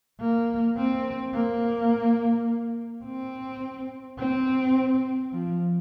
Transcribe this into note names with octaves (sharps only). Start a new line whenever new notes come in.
A#3
C4
A#3
C4
C4
F3